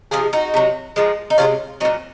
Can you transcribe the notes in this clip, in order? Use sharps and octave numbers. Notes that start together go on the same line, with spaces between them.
C3 F3 G#3 F4 G#4
D#4 F#4
C3 F#3
A#2 F3 G#3
D#4
C3 D#3 G#3 C#4 F4
A#2 F#3 C4 D#4